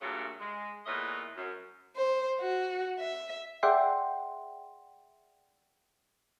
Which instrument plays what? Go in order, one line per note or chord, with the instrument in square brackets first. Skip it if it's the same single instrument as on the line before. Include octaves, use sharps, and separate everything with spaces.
[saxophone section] G2 A#2 C#3 F#3 A3
G#3
E2 A#2 A3 B4 C#5 D#5
F#2
[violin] C5
F#4
E5
[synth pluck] G#4 D5 E5 F#5 G5 C6